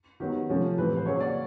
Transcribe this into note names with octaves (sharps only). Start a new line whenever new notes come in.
D#3 F#3 B3 G4
C3 F3 A3 C#4
A2 E3 G3 C4 B4
C5
C#3 F#3 A#3 C#4 C#5
D5